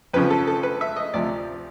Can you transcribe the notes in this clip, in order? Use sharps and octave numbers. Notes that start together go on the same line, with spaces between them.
F2 C#3 F3 B4
A4
A4
B4
E5
D#5
D2 C3 F3 D5